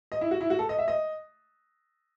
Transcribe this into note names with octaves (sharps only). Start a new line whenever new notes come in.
D#5
E4
F#4
E4
F#4
A4
D#5
E5
D#5